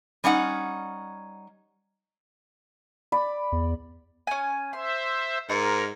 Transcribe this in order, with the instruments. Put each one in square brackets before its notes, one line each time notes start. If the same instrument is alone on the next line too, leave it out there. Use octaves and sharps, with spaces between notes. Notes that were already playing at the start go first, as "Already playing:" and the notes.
[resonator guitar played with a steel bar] G3 C#4 D#4 F#5
[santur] D5 B5
[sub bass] E2
[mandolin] C#4 G#5
[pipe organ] C5 E5 [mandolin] C6
[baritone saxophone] G#2 [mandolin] D#4 [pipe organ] A#4